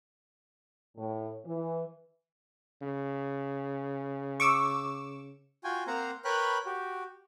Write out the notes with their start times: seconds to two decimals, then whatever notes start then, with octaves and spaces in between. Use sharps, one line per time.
0.97 A2
1.46 E3
2.82 C#3
4.40 C#6 D6 E6
5.64 F4 F#4 G5 G#5
5.87 A#3 C4 C5 F5 F#5 A#5
6.25 A#4 B4 C#5 G5 B5 F#6
6.65 F#4 G4